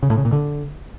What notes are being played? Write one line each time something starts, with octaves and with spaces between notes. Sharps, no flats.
C#3
A2
C#3
A#2
D3